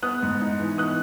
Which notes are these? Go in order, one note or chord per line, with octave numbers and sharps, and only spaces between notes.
B3 D#6 F#6
G#2
D#4
E3
B3 D#6 F#6